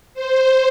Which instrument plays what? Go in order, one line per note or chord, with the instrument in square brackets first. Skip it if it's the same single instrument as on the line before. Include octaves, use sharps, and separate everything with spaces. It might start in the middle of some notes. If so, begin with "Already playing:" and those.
[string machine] C5